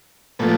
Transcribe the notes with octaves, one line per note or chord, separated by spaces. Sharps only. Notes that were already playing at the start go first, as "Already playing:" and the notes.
A#2 F3 A3 B3